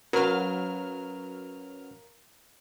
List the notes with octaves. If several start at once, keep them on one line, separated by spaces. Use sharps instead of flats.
F#3 C#4 A#4 B4 F5 F6